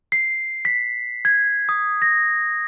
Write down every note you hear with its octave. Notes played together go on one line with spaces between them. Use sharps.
C7
B6
G#6
D#6
A#6